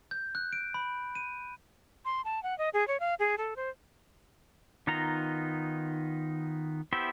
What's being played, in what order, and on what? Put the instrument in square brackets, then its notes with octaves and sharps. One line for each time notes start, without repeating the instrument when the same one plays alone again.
[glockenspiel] G6
F#6
D7
B5
D#7
[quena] C6
A5
F#5
D#5
G#4
C#5
F5
G#4
A4
C5
[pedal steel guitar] D#3 B3 D#4 F4 A#5
B3 E4 G4 C5 E5